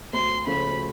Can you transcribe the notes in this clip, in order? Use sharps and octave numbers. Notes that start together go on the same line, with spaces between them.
D2 C6
C#3 F3 A3 C#4 B5